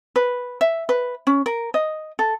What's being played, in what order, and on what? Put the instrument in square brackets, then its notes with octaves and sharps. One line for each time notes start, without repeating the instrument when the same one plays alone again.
[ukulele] B4
E5
B4
C#4
A#4
D#5
A4